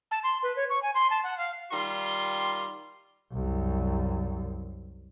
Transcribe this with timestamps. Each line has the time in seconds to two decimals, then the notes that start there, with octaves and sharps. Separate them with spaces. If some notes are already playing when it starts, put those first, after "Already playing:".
0.11 A5
0.23 C6
0.43 B4
0.56 C#5
0.69 C#6
0.82 G#5
0.94 C6
1.10 A5
1.23 F#5
1.38 F5
1.71 D#3 G3 F4 C6
3.33 C2 F#2